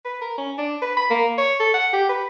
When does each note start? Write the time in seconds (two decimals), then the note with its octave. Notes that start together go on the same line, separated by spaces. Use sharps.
0.05 B4
0.21 A#4
0.38 C#4
0.58 D4
0.82 B4
0.97 B5
1.10 A#3
1.38 C#5
1.60 A4
1.74 F#5
1.93 G4
2.10 B4